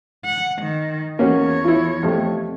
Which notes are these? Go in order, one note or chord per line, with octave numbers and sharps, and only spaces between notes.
F#5
D#3
E2 A#3 C#4 F#4 C#5
E4 F4
F2 C3 A3